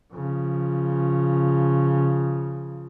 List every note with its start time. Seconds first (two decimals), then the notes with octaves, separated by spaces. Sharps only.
0.14 C#3 F3